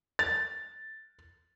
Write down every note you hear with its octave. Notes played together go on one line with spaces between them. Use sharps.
A6